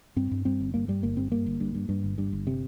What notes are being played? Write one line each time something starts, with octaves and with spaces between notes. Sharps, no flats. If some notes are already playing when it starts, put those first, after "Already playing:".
G2 C4
G2
G2 C4
G1
G2 A#3
G2 G3
G1 A#3
G2 C4
G2 A#3
G1
G2
G2
G2
G1
G2
G1
C3